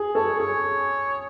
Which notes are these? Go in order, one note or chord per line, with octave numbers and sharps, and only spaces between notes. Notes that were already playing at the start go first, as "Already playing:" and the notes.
Already playing: G#4
A4 C#5
G#4 C#5